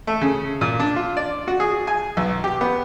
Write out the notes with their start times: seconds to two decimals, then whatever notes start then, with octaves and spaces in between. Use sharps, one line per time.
0.07 A3
0.21 C#3
0.61 A#2
0.79 D4
0.96 F4
1.17 D5
1.48 F#4
1.60 G#4
1.87 G#5
2.17 B1
2.44 G4
2.61 B3